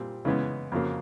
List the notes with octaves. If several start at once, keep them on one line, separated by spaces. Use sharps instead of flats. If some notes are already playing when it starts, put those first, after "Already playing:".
Already playing: A#2 G3 C4
C#3 E3 G#3 B3
F2 C#3 F#3 A#3